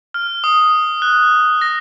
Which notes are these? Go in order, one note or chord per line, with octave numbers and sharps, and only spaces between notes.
F6
D#6
F#6
A#6